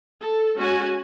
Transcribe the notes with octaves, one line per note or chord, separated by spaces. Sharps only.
A4
G#3 C#4 F#4 G#5